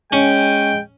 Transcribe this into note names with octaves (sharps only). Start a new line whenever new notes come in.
G#3 C#4 G5